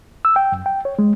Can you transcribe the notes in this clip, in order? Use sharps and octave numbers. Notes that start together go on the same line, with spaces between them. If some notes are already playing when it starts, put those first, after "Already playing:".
E6
G5
F#2
G5
C#5
G#3